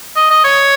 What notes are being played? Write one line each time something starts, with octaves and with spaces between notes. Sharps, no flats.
D#5
D#5
C#5